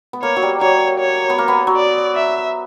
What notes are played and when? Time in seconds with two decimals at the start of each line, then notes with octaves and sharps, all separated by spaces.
0.13 B3
0.23 A#3 C#5
0.36 F#3
0.42 G3
0.61 F#3 C#5
1.00 C#5
1.30 B3
1.38 A#3
1.48 B3
1.67 F#3
1.76 D5
2.15 E5